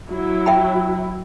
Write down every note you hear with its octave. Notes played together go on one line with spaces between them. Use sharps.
F#3 E4
E5 G5 B5